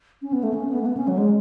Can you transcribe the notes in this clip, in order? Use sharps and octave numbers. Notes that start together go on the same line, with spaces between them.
C#4
B3
A3
C#4
B3
A3
B3
C#4
F#3
G#3